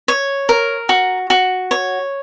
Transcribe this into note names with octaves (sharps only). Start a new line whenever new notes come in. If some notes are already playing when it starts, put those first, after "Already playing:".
C#5
A#4
F#4
F#4
C#5